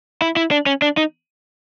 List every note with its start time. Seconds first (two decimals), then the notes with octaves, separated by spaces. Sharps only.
0.22 E4
0.36 E4
0.51 D4
0.66 C#4
0.82 D4
0.97 D#4